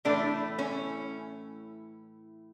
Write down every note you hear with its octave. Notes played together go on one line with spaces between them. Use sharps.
A2 E3 A3 D4
C#4